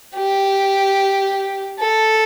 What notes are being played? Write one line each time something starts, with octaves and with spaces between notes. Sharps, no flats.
G4
A4